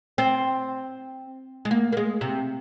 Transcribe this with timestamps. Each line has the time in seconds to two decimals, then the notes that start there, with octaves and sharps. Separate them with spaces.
0.18 C4
1.65 G#3
1.71 A#3
1.92 A#3
1.97 G#3
2.21 C3